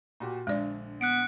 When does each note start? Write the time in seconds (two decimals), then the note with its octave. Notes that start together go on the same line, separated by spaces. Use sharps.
0.20 A#2 F#4 G4
0.47 A#1 D3 G#3 D5
1.01 B3 F#6 C#7 D7